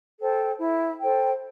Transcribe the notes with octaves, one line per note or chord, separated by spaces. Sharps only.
A4 C5 G5
E4
A4 C5 G5